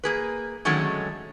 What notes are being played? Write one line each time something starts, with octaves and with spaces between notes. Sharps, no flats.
A#3 G#4 B4
D3 D#3 F#3 G#3 A3 C#4